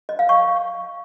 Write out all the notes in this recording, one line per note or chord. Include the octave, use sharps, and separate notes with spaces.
D#5
F5
C#6